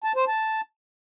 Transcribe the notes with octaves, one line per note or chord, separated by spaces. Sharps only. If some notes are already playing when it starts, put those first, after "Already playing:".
A5
C5
A5